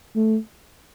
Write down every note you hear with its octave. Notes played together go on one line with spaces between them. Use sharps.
A3